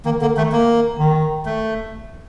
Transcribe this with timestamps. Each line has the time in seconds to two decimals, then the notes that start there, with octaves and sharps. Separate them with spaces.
0.05 D#3 A#3
0.21 D3 A#3
0.37 D#3 A3
0.52 A#3
0.99 D#3
1.46 A3